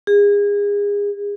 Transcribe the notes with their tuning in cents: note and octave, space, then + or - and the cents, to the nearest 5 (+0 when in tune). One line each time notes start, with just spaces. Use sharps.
G#4 -30